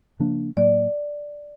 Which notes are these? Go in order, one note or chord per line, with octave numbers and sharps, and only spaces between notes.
C#3 F3 A#3 D4
A2 F#3 A#3 D5